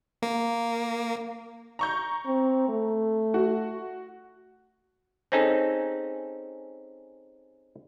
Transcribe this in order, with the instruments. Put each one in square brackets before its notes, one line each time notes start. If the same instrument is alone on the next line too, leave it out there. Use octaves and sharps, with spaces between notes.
[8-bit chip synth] A#3
[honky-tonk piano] A#5 C#6 G6
[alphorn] C4
A3
[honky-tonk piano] F#4
[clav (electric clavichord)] C4 C#4 D#4 G#4 A4